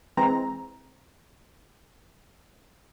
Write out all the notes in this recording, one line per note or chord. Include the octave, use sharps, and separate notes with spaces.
E3 G#3 C4 A#5